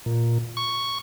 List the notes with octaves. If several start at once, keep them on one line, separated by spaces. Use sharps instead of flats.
A#2
C#6